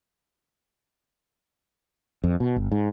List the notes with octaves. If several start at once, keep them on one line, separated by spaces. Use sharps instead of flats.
F2
B2
G1
G#2